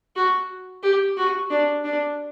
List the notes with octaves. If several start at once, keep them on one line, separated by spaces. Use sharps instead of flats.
F#4
G4
F#4
D4
D4